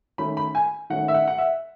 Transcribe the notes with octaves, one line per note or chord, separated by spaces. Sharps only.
D#3 A3 C#4 B5
B5
G#5
D#3 A3 C#4 F#5
E5
F#5
F#5
E5